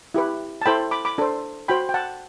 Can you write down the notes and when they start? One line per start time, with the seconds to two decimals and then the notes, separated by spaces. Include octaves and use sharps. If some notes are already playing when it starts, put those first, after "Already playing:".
0.14 E4 G4 B4
0.62 A5
0.66 E4 A4 C5 G5 B5
0.91 B5 D6
1.05 B5 D6
1.18 D4 A4 C5
1.68 F#4 C5 G5 B5
1.89 G5
1.94 F#5 A5